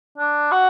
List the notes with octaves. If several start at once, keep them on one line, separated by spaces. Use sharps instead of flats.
D4
F#4